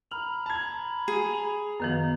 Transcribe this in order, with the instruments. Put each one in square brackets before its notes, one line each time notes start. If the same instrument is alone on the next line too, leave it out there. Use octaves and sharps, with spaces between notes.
[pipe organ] A#5 B5 [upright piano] F6
[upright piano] A5 G#6
[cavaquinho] G#4
[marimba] F#2 D#3 F3 [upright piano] B3